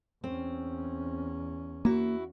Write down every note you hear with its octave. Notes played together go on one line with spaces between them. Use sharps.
E2 C4 C#4
A#3 E4 F#4